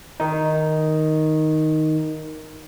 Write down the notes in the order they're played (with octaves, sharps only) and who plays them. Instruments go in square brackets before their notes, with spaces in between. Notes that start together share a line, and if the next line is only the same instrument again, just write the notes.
[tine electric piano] D#3 D#4